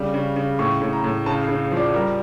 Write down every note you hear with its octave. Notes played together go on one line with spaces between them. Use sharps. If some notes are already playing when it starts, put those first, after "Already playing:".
Already playing: C#3 G3
C#3
C#3
A2 C#6
A2
A#5
A2
C#3 A5
F5
C#3
F3
D5
G3 A#4